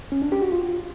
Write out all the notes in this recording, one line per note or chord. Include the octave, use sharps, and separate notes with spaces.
C#4
D4
G4
F#4
F4